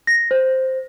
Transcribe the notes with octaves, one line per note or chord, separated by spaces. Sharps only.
A#6
C5